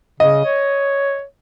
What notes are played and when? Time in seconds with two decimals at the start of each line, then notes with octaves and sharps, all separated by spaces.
0.20 C#3 D#5
0.45 C#5